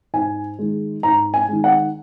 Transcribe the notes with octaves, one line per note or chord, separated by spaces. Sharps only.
G#2 G#5
D#3 G#3
G#2 A#5
G#5
D#3 G#3
F#5